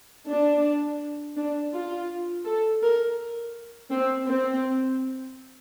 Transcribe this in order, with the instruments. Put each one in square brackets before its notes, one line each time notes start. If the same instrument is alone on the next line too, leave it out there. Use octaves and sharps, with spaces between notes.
[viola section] D4
D4
F4
A4
A#4
C4
C4